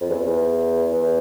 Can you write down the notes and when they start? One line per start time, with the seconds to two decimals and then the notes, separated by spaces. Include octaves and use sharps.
0.01 F2
0.09 E2
0.26 E2
0.93 E2